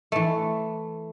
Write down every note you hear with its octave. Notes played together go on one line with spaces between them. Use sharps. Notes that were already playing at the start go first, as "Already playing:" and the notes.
E3 A3